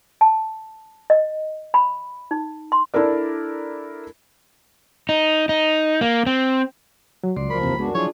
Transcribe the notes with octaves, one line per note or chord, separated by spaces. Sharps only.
A5
D#5
B5
D#4
C6
D4 E4 A4 A#4 D5
D#4
D#4
A#3
C4
F#3
C#2 F#3 D5 C6
D#2 F3 A#4 B5
E2 C3 C4
F#2 G#3 B3 D4 F#4
F3 F#3 D4 E4 F4 G#4 C#5